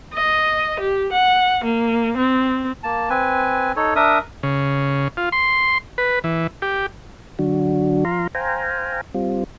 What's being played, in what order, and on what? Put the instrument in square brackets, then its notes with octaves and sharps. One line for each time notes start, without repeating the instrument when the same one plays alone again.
[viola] D#5
G4
F#5
A#3
C4
[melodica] A#3 A5
C4 B4 G#5
D#4 A4 C#5
D4 A#4 E5 D#6
[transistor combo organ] C#3
F4
C6
B4
E3
G4
[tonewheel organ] D3 F#3 D4 F#4
F3 F5 A#5 C6
C5 F5 G5 G#5 A#5
G3 C4 F4